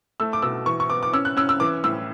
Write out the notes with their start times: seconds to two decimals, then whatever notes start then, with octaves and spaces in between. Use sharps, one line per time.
0.20 A3 E6
0.33 D6
0.42 B2 E6
0.66 E3 C#6
0.80 C#6
0.90 B3 D6
1.03 D6
1.13 C#4 E6
1.25 F#6
1.37 C#4 E6
1.49 E6
1.60 E3 D6
1.84 A2 E6